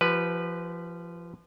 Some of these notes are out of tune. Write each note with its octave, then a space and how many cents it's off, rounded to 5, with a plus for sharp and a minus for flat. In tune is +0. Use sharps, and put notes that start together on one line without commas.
F3 -25 G4 -35 B4 +0